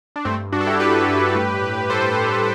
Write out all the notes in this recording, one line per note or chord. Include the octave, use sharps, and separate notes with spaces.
D4
G2 A3 C4
G2 D4 F#4
A4
E4 G4
G2 G4 B4
G2
A2
A2
A2 A4 C5
A2